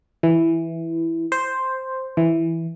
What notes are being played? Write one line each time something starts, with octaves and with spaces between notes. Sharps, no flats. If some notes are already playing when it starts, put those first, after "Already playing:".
E3
C5
E3